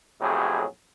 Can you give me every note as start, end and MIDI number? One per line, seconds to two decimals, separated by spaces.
0.21 0.65 35
0.21 0.65 41
0.21 0.65 45
0.21 0.65 54
0.21 0.65 67
0.21 0.65 68